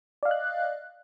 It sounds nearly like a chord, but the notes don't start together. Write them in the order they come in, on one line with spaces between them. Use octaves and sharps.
D5 F5 D#5 F#6